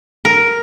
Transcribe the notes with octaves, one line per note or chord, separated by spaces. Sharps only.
A#4